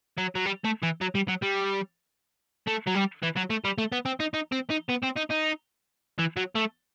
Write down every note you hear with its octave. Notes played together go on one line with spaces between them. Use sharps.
F#3
F#3
G3
A3
E3
F#3
G3
F#3
G3
A3
F#3
G3
E3
F#3
A3
G3
A3
B3
C4
D#4
D#4
C4
D#4
B3
C4
D#4
D#4
E3
F#3
A3